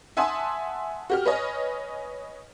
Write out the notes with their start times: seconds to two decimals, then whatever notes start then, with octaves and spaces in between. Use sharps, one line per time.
0.17 E5 F#5 G#5 A5 C6 D#6
1.10 F#4 G4 F6
1.25 B4 C#5 D#5 G#5